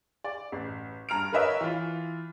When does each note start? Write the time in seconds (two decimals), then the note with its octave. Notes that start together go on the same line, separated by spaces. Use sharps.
0.24 D5
0.52 A1
1.09 G2 A#5 F6 D7
1.32 A#4 B4 C#5 D#5 E5 A#5
1.61 E3 F4